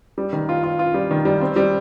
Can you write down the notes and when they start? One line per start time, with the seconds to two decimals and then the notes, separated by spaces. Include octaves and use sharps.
0.18 G3
0.33 D#3
0.49 F4
0.63 F4
0.79 F4
0.94 G3
1.11 D#3
1.25 G3
1.41 C4
1.56 G3